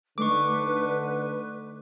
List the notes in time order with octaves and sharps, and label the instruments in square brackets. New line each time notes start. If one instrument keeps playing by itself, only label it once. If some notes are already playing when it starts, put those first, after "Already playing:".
[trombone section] D3 [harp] A3 D4 D#4 [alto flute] B4 [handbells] C#6 D6